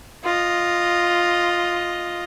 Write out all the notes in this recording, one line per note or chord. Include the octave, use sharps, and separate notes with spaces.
F4 D#5